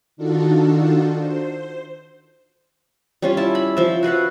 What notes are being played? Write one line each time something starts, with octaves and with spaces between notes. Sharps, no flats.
D#3 D4 D#4 F4 F#4 A4
C5
G3 C#4 F4
E4 A5
B5
F3 E5
F#4 B4 F5 F#5